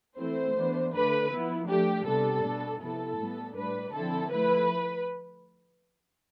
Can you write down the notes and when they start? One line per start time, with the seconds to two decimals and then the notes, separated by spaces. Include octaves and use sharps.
0.18 E3 A3 C4 E4 C5
0.55 E3 B3 D4
0.93 D3 A3 D4 B4
1.31 F3 B3 E4
1.68 F3 A3 D4 G4
2.05 C3 G3 B3 D4 A4
2.42 B2 B3 D4
2.80 C3 F3 B3 E4 A4
3.17 A2 G3 B3
3.55 A2 G3 D4 B4
3.92 D3 F3 C4 E4 A4
4.30 F3 A3 E4 B4